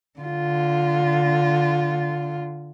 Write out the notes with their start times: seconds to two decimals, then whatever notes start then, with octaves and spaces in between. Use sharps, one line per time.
0.19 D3 F4